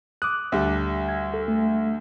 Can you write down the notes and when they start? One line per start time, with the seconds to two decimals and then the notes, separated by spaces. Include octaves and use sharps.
0.22 D6 D#6 F#6
0.52 D2 D3 G3
1.09 G#6
1.34 A4
1.48 A3